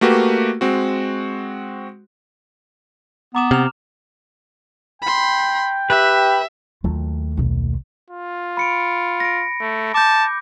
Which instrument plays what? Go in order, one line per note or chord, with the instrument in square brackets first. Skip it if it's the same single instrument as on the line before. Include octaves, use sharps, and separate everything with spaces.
[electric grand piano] A3 A#3 F#4 G4 B4
G#3 C4 F#4
[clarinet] B3 [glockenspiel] A#5 D6 E7
[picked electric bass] C3 [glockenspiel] F6 F7
[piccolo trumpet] G5 [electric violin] B5 C6
[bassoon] G4 [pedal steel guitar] B4 [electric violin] E5
[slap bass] D#2 F#3 A3 [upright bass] F4
[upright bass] B1 B2
[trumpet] F4
[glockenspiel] B5 C#7 D7
A#6 D7
[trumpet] A3
[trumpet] A5 [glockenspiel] D6 G6